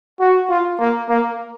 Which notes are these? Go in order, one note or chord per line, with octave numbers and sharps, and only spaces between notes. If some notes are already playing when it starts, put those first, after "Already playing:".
F#4
F4
A#3
A#3